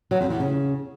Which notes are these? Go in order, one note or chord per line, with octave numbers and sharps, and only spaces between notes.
F#3
F2
E2
C#3